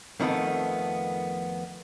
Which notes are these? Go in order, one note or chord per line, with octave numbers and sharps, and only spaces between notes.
F2 D#3 A3 B3